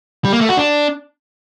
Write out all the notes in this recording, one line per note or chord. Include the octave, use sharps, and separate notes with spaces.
G3
A#3
A3
F#4
D4